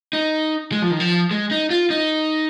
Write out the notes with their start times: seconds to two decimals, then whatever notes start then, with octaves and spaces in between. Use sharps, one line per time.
0.13 D#4
0.72 G#3
0.82 F3
0.91 D#3
1.00 F3
1.31 G#3
1.51 D#4
1.71 F4
1.90 D#4